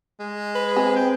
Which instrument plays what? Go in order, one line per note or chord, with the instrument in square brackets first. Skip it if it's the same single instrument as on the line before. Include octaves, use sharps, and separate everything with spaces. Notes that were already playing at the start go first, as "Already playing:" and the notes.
[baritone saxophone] G#3
[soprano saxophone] B4
[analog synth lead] C4 [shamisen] G#4
[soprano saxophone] G5